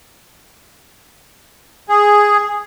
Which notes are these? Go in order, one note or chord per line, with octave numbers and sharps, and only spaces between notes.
G#4